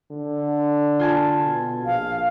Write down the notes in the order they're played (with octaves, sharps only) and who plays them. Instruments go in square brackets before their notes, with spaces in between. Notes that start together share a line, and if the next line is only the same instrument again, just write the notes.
[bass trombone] D3
[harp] F4 G#5 A5
[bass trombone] B2
[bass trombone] A#1 [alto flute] F5